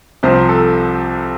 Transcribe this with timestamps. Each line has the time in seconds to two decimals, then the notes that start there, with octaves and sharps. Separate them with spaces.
0.23 C2 C3 F3 C5
0.49 A4